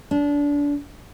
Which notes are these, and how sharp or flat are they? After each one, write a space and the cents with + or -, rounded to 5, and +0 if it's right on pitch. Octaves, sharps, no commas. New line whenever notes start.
D4 -25